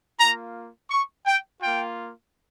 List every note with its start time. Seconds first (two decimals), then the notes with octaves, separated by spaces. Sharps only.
0.20 A#3 F4 A#5
0.90 C#6
1.26 G5
1.61 A#3 F4 G5